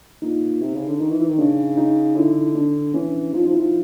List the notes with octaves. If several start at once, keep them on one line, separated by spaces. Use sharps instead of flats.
A#2 D#4
C3
C#3
D3
D#3 D#4
E3
E3
D#3
C#3 D4
D#4
D3 E4
D4
E3 C#4
F3 D#4
F3
E4
F3